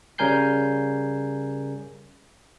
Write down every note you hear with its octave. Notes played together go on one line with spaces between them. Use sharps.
C#3 G3 A#4 G#5 G6 C7